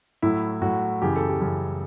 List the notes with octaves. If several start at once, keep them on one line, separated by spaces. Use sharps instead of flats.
A2 F#3 E4
A2 F#3 F#4
F#2 C#3 E3 G4
A4
G4
F#2 C#3 E3